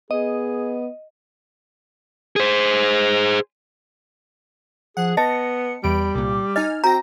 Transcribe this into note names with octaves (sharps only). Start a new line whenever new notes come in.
B3 G#4 D#5
G#4 C5
F3 G#4 F#5
B3 D#5 A5 A#6 C#7
E2 G3 B5 D7
C2 A#2 D6
D#4 D#5 G#5 F6
C4 F#4 G5 A#5 A#6